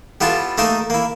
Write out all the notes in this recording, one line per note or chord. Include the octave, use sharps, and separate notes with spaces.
G3 B3 E4 F4 A4 E5
A3 A#3 D#4 A#4 E5
A#3 E4